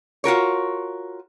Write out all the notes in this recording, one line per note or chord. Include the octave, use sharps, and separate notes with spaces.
F4 F#4 A#4 C#5